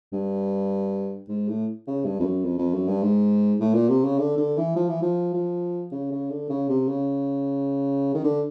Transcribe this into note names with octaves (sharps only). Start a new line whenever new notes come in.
G2
G#2
A2
C#3
G2
F2
F#2
F2
F2
F#2
G2
G#2
A2
A#2
C3
C#3
D3
D3
E3
F3
E3
F3
F3
C#3
C#3
D3
C#3
C3
C#3
D#3
D3